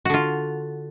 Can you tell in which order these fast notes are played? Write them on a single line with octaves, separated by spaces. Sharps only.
F#4 D3 F4